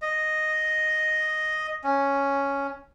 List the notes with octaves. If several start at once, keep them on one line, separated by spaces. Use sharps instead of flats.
D#5
C#4